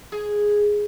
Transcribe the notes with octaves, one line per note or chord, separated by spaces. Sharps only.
G#4